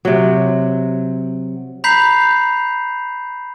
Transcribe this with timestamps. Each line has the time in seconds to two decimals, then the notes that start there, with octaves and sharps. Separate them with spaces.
0.05 C3 F#3
1.84 A#5 B5 G6 B6 C7 F7